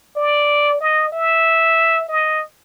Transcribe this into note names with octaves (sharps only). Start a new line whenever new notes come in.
D5
D#5
E5
D#5